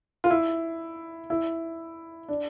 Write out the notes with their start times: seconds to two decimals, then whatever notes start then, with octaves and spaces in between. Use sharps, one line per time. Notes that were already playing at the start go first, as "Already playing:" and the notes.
0.24 F4
0.30 E4
1.30 E4
2.28 D4